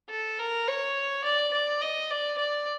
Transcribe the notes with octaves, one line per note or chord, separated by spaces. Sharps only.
A4
A#4
C#5
D5
D5
D#5
D5
D5